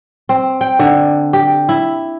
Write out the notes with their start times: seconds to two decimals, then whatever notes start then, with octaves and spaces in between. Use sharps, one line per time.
0.29 C4
0.61 G5
0.79 D3
1.33 G4
1.69 E4